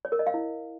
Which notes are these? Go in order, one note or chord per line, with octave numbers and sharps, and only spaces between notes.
C#5
A#4
D#5
F5
E4